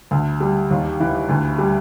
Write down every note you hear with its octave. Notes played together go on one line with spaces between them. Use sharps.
D2
G3
D#2
E3
D2
G3